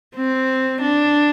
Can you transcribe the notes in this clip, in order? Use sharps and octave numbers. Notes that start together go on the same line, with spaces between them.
C4
D4